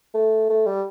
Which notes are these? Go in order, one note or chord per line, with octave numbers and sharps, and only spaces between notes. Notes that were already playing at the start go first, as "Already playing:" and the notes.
A3
A3
G3